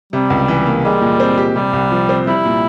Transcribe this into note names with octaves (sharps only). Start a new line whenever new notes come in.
C3 G3
C#2
E3
A#3
G3 G#3
A#2
C4
G4
C3 G3
C2
F3
C4
G3 E4
A#2